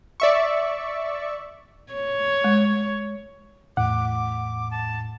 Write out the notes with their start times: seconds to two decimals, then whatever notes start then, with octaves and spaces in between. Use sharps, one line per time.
0.20 D5 E5 C#6
1.93 C#5
2.44 G#3
3.77 E2 A2 F#5 D6
4.71 A5